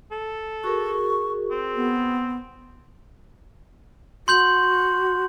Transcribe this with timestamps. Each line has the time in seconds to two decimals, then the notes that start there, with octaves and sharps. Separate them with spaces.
0.11 A4
0.64 F#4 G#4 A#4 C#6
1.51 C4
1.75 B3
4.28 F#4 C6 G6 F#7